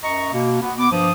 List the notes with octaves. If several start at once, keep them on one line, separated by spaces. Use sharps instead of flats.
F#2 D#5 A#5 C#6
B2 A#3
B3
B3 D6
G2 F3 D#6